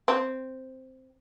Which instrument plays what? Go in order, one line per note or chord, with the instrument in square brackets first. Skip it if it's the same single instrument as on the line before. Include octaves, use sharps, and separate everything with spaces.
[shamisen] C4